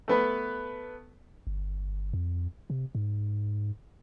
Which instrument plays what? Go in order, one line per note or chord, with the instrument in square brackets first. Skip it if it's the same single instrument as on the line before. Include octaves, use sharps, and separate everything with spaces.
[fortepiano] A3 B3 B4
[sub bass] G1
F2
C3
G#2